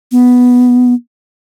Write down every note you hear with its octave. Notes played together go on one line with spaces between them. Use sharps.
B3